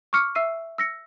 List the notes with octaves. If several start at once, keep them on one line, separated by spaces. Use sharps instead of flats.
C#6 D6 F6 C#7
E5 E6 C7 D#7
E6 A#6 C#7